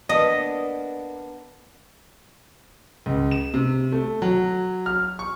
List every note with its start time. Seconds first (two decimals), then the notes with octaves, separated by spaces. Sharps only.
0.09 A#3 B3 D4 D#5
3.06 C#2
3.31 E7
3.54 C3
3.92 A3
4.22 F#3
4.86 F6
5.19 C#6